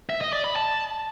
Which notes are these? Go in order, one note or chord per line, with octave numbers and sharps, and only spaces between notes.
E5
D#5
D5
B5
A5